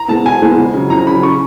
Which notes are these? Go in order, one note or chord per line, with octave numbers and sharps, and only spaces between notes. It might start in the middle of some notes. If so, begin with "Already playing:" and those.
Already playing: A#5
G#3 B3 A5
B2 G#5
G#3 B3
F2
C#3 F#3
F2 A#5
C#3 F#3 B5
C#3 C#6